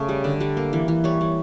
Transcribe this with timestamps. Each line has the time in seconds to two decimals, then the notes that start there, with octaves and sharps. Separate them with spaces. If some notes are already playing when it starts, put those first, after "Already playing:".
Already playing: C#3 A3 C#5
0.09 G3
0.24 D3
0.40 G3
0.57 A#3
0.73 E3
0.88 E3
1.04 G3 C#5
1.21 G3